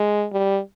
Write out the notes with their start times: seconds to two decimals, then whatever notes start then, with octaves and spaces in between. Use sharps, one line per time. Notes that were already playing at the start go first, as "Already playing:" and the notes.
Already playing: G#3
0.33 G3